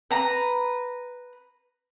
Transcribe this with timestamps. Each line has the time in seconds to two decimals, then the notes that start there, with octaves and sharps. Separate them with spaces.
0.11 B4 A#5